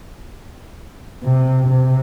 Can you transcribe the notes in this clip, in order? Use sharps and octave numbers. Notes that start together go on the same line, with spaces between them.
C3
C3